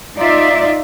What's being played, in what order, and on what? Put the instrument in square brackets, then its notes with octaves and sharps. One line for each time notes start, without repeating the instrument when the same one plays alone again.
[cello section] D#4 F4 D5 E5